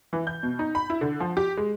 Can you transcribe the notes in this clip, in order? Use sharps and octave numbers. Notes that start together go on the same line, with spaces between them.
E3
G6
B2
D#4
B5
E4
D3
F3
G4
G#3